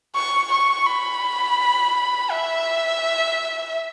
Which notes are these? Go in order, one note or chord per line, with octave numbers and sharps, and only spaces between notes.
C#6
C#6
B5
E5